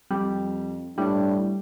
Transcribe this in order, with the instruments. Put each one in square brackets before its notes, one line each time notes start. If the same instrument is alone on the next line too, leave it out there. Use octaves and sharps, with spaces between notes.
[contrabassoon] F2 [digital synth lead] G3
[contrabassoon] A2 [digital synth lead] G3 [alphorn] D4